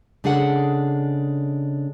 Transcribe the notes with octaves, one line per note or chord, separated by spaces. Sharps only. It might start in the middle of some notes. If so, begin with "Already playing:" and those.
C#3 G#3 D4 G#4 A4 F#5